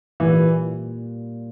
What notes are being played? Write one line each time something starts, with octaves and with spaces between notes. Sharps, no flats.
A#2 E3 G3 A#3